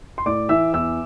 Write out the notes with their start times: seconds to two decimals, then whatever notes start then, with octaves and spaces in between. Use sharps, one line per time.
0.18 C6
0.26 A2 D5 D6
0.49 E3 E5 E6
0.73 E2 E5 E6